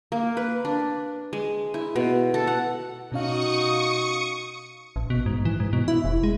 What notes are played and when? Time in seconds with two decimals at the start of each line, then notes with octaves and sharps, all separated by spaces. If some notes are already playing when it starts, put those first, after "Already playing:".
0.12 A#3
0.37 B4
0.65 D4
1.33 G#3
1.74 E4
1.96 B2
2.34 A4
2.47 F#5
3.12 B2 C#4 D#4 F#4 F5 C#6 D#6 C#7
4.96 A1
5.10 B2
5.26 G#2
5.45 E3
5.60 G#2
5.73 B2
5.88 E4
6.05 F1
6.23 G#3